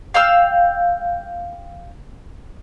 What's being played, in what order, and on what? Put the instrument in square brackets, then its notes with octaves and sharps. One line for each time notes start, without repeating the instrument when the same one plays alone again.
[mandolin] F5 G5 E6 F6